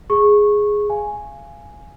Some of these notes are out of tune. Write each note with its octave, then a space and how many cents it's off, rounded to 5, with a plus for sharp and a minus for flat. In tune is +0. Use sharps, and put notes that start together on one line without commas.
G#4 +0 C#6 -15
F5 -25 G#5 +0